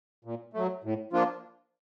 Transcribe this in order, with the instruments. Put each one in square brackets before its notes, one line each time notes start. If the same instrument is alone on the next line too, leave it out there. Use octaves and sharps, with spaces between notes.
[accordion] A#2
F#3 A3
A2
F3 A#3 D4 F4